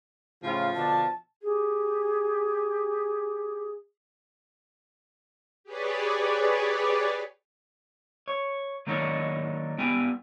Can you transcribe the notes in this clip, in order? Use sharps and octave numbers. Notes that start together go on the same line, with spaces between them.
A2 C#3 F3 F4
B2 D3 D4 A5
G4 G#4
G4 G#4 B4 C#5 D5
C#5
D#3 F#3 A#3 D4 D#4 C#5
G3 B3 G4 G5 G#5